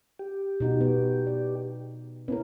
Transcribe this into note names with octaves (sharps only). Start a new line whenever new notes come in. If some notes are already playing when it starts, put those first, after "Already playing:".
G4
B2 D#4 F#4
B3
D5
B3 C#4 E4 A#4